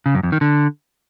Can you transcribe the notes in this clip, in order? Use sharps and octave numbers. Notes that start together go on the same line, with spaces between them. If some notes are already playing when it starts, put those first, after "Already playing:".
C#3
F#2
F2
D#3
D3